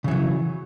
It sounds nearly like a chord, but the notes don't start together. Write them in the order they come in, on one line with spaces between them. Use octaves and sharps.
C#3 E3 F#3